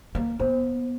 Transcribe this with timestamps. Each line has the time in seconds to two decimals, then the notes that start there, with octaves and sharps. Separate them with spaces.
0.15 A#3
0.40 B3 C5